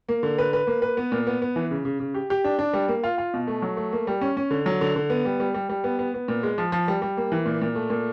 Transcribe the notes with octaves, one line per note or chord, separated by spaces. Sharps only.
A#3
D3
B4
B4
A#3
B4
B3
A#2
B3
B3
E3
C#3
C#3
C#3
G4
G4
D4
D4
G3
A#3
F4
F4
B2
A3
F#3
A3
A#3
G3
C#4
C#4
D3
F#3
D3
D3
B3
G3
G3
G3
G3
B3
B3
B3
A#2
G#3
F3
F3
G3
G3
A#3
E3
A#2
A#2
A3
A#2